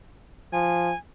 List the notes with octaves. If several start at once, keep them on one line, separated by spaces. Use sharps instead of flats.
F3 G#5